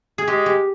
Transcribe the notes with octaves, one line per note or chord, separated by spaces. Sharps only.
G#4
G#3 G4
G4